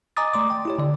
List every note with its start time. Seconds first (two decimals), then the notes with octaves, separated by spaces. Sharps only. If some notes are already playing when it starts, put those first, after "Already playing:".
0.17 D#5 G#5 A#5 D6 D#6 A6
0.33 A3 D5 C6 D6
0.50 G5
0.65 E4 G4 C#5
0.78 D3 D5